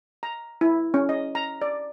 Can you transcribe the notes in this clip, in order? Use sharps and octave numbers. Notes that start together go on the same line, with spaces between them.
A#5
E4
C#4
D#5
A#5
D5